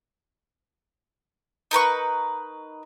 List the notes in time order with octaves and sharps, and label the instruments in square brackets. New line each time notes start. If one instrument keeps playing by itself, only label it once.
[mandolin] D#4 A#4 B4 C#6